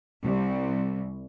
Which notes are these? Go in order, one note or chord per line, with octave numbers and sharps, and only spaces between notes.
C2